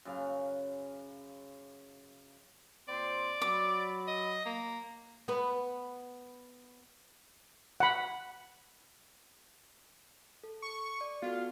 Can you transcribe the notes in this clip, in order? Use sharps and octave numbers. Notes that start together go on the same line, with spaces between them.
F#2 C#3 F5
A#2 C4 D5 C6
F#3 B5 D6
D#5
A#3
B3 B4
F#5 B5
A4
C#6
D5
B3 F4 F#4 A4